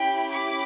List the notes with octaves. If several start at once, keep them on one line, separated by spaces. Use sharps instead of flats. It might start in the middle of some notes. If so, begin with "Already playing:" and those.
Already playing: C#4 E4 G4 G5 B5
B5 D6